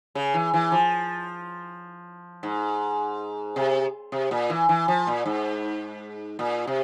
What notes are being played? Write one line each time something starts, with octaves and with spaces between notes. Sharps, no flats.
C#3
E3
E3
F3
G#2
C3
C3
A#2
E3
E3
F3
A#2
G#2
A#2
C3